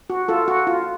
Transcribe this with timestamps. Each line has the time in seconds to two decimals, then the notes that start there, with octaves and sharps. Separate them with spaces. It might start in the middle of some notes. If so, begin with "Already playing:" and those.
0.10 F#4
0.28 F4 A4
0.48 F#4
0.67 F4